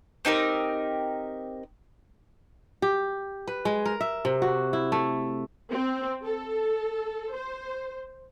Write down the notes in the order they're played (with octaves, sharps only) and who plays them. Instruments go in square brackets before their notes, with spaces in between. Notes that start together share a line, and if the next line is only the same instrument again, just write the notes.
[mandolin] C4 D#4 G4 A#4
[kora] G4
B4
G#3
A#4
E5
C3
F#4
E4
A3
[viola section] C4
A4
C5